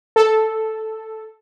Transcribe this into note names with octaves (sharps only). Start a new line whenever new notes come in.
A4